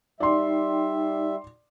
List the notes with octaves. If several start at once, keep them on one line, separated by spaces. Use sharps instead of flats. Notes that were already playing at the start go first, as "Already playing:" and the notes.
G3 D#4 D5 E5 G5 C6